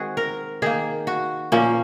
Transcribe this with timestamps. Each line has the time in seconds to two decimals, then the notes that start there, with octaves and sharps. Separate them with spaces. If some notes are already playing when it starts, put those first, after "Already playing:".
Already playing: D#3 G#3 C4 F#4 G#4
0.17 A#4
0.62 D#3 A#3 G#4
1.07 F#4
1.52 A#2 F3 A#3 C#4